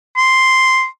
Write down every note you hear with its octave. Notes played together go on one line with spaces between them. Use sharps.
C6